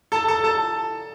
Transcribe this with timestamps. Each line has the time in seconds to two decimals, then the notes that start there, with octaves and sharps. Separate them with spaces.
0.12 A4 A5
0.28 A4 A5
0.44 A4 A5